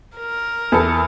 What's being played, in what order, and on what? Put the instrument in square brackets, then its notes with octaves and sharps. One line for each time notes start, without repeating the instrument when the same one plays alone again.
[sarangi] A#4
[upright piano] E2 A4